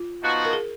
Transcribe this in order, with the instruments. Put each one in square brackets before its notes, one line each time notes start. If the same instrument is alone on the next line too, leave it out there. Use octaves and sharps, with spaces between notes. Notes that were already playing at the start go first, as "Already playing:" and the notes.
Already playing: [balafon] F4
[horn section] F3 B3 D#4 F#4
[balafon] A#4
G#4